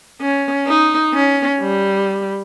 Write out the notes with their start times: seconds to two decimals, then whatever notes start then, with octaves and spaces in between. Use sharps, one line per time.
0.21 C#4
0.67 D#4
1.14 C#4
1.61 G3